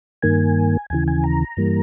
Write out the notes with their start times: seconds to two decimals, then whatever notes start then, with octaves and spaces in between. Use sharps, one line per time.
0.22 G2 D#3 A#3 G#5
0.90 D#2 C#3 E3 G#5
1.08 G#5
1.24 A#5
1.57 G2 E3 G3 A#3